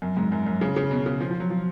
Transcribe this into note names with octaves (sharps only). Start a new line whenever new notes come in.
F#2
G#2
F#2
F#2
C#3
C#3
B2
C#3
F3
F3
F#3
F3